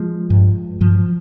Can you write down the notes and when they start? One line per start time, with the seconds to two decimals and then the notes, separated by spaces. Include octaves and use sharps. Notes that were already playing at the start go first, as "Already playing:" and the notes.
Already playing: F3 G#3
0.30 G2
0.81 G2 F3